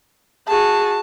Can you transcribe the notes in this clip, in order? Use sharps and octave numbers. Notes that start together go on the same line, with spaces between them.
F#4 G#4 A5